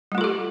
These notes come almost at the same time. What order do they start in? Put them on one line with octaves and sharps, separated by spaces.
G3 A3 F4 A4 G4